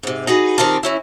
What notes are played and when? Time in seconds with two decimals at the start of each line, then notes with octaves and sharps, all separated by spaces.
0.03 G#2 C3
0.27 D#4 F#4 G#4 B4
0.58 A#2 D#3 C4 G4 A#4 A5
0.83 E3 C#4 E4